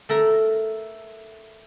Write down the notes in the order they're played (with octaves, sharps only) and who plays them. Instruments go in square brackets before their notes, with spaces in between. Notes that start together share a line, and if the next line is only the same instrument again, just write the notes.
[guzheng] A3 A4 A#4